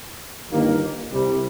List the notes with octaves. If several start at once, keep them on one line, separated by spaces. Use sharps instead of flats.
G1 G2 D#3 A#3
C2 C3 G3